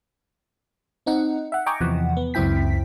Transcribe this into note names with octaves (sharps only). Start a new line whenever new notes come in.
C4 D#4 F#5
E5 F#5
D#5 G5 G#5 A#5 C#6 D6
E2 C3 E3 F3 F#5
B3
C#2 F#2 C4 E4 G5 B6